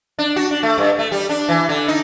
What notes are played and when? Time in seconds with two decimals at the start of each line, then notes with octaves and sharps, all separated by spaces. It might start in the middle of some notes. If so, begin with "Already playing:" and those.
0.19 D4
0.36 F#4
0.51 D4
0.63 A3
0.78 G2
0.99 A3
1.12 G3
1.29 D4
1.49 E3
1.69 D3
1.88 D#4